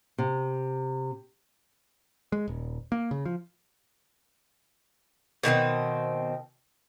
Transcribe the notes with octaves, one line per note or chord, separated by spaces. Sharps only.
C3
G#3
D#1
A#3
C#3
F3
B2 D#3 A3 C4